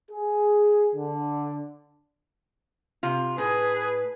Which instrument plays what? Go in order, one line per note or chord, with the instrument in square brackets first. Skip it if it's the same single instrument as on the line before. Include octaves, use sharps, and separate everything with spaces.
[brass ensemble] G#4
D3
[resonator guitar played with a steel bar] C3 F4
[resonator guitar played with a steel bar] A2 [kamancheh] G#4 [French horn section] B4